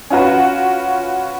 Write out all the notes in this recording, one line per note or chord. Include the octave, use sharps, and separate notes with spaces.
C#4 F4 F#4 B4